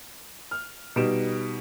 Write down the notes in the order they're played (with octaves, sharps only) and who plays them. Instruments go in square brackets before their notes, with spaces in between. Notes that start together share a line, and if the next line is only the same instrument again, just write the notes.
[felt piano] F6
B2 G3 D#4 D7 E7